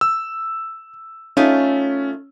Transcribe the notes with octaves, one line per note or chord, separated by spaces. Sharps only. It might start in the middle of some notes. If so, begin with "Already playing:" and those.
E6
A3 C#4 D#4 F4